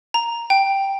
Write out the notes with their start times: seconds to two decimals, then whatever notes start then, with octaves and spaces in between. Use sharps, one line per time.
0.14 A#5
0.50 G5